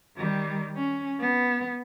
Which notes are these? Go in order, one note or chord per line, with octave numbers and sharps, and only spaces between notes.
D#3 G3
C#4
B3